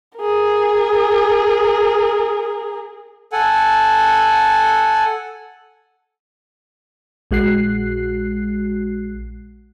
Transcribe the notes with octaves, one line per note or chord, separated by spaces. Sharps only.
G#4 A#4
A4 F#5 G#5
A#1 G#3 F#4 F#6 C7